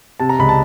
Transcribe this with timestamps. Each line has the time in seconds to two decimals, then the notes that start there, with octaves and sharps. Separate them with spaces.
0.20 C3 A5
0.29 A#5
0.39 C#2 B5
0.49 A5